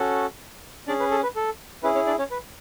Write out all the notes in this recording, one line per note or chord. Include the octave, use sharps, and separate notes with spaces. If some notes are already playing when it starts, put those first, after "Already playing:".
Already playing: C#4 F#4 A4
C#4 D4 G#4 D5
B4
A4
B4
A4
C#4 E4 G#4 B4
C#4 C#5
D4 D5
C#4 C#5
B4